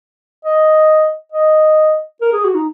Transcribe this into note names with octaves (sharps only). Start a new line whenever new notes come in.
D#5
D#5
A#4
G#4
F#4
D#4